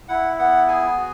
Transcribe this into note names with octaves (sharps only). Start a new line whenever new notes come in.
E4 F#5
B3 F#5
G#4 G#5
F#4